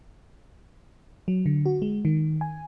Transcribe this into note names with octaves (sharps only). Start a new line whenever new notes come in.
F#3
D3
F#4
G#3
D#3
G#5